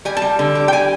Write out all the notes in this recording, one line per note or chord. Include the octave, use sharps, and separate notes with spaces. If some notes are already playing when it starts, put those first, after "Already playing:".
G3 G#5
A5
G3
D3
G3
G5
G3 G#5